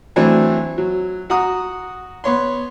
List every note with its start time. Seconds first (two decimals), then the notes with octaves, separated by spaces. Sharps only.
0.16 E3 F#3 A3 C4 D4
0.78 F#3
1.30 F#4 F#5 A#5 D#6
2.24 B3 C#5 C6